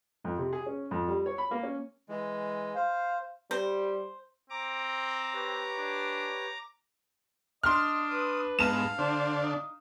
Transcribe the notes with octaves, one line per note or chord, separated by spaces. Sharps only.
F2
C3
G#4
C#4
F2
G3
C#5
B5
A#3
C#4
E3 G#3
C5 F5
G3 C5
C4 A#5 D6
G4 B4 C#5
D4
D4 D#5 C6 F6
B4 D#6
G#2 G#3 B3 F5 A5 E7
D3 D4 C5
D#4